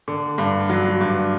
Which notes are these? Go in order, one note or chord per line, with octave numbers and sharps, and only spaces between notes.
D3
G2
F#3
G2